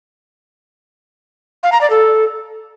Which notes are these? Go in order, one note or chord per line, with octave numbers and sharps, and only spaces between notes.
F5
A#5
D5
A4